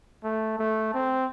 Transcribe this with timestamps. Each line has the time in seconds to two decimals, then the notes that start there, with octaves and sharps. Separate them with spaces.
0.24 A3
0.59 A3
0.94 C4